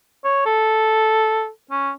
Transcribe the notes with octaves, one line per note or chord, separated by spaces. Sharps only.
C#5
A4
C#4